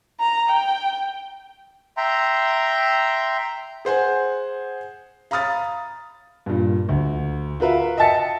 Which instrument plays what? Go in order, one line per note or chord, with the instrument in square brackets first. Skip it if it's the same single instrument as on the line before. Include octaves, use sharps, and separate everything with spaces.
[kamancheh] A#5
G5
[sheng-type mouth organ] E5 G5 A#5 C6
[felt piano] G#4 C5 F#5 G#5
F5 A#5 B5 D#6 F6 A6
[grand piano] G2 A#2
D2
F4 F#4 A#4 B4 E5 F5
D#5 E5 G5 A5 A6 C#7